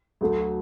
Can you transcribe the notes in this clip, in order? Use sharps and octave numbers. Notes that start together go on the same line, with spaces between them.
D2 D3 F#3 A3